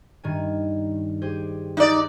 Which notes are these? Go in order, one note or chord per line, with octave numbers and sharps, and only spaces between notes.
G2 D#3 G#5
G4 G#4 C5
D#4 D5 F#6